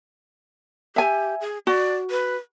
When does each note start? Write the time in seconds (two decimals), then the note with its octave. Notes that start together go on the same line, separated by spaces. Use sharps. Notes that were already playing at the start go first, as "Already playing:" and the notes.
0.96 G4 E5 G#5
1.41 G#4
1.67 F#4 D5
2.11 B4